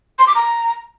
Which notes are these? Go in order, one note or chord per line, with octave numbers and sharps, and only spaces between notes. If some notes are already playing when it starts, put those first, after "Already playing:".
C6
D6
A#5